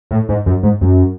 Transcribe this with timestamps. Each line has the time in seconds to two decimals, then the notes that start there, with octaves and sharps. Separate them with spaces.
0.11 A2
0.29 G#2
0.46 F#2
0.63 G#2
0.81 F#2